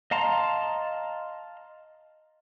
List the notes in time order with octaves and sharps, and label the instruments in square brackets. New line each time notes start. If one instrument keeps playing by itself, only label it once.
[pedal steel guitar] D#5 F5 A5 A#5 C6